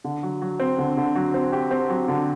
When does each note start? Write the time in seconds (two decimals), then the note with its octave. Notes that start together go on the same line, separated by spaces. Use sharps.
0.04 D3
0.23 F#3
0.42 F#3
0.60 C4
0.78 D3
0.97 D3
1.15 F#3
1.34 C4
1.52 G4
1.71 C4
1.90 F#3
2.08 D3